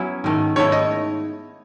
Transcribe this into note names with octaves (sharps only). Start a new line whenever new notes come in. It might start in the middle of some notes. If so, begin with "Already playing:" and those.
Already playing: F#3 B3 C#4 E4
G#2 D#3 A3
G#2 D#3 A3 E4 C#5
D#5